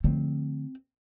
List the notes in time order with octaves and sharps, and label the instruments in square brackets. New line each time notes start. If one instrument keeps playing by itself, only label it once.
[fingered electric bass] D3 F3 A3 [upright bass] C4